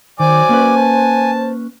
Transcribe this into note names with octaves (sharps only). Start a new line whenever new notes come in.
D#3 F#3 C5 D5 G#5 D6
A#3 C#4 B4
A5